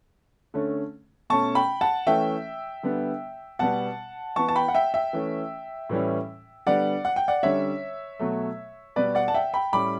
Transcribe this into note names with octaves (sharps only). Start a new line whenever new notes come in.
D3 A3 C#4
B2 A3 C#4 A5 C#6
G5 B5
F#5 A5
E3 A3 C#4 E5 G5
D3 G3 B3
B2 G3 B3 F#5 A5
E3 B3 A5 C#6
A5
G5 B5
F#5
E5 G5
E5 G5
E3 A3 C#4
A2 E3 G3 C#4
D3 G3 B3 D5 F#5
F#5
G5
D5 F#5
D3 G3 C#4 C#5 E5
B2 F#3 A3
B2 G3 B3 B4 D5
D5 F#5
A5
E5 G5
G5 B5
A2 G3 C#4 B5 D6